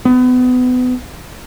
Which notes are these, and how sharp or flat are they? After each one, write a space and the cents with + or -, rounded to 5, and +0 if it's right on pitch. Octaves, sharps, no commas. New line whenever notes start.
B3 +30